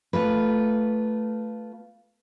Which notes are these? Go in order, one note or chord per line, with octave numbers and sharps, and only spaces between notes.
A3 F4 B4